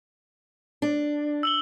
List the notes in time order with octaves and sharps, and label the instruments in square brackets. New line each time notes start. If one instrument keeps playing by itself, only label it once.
[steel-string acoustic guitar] D4
[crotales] E6 F#7 G7